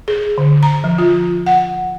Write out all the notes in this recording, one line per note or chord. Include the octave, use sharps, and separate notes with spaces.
G#4
D3
A#5
F3
F4
F#5